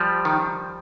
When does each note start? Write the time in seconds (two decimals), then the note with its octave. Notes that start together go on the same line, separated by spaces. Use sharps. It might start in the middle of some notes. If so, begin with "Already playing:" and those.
Already playing: F3 G3
0.25 D#3